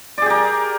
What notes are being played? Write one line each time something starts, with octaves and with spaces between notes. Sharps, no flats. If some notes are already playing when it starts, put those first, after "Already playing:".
G4 G#4 A#4 D5